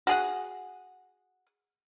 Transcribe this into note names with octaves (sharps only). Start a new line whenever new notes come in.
F#4 G#4 F#5